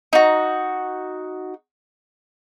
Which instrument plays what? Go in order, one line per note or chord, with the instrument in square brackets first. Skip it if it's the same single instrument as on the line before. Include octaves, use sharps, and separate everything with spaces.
[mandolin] D#4 F#4